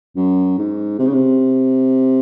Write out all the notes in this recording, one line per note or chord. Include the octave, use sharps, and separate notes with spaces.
F#2
G#2
C3
C#3
C3